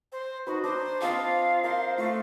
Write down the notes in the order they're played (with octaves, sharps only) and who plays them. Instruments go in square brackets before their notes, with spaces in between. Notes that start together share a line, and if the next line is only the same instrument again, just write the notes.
[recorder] C5
[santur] D#4 B4 [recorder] F#4
[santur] D4 [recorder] C5
[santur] C4 D#5 A5 [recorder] F4 [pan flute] F5
[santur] A#4 [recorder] C5
[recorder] A3 [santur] F4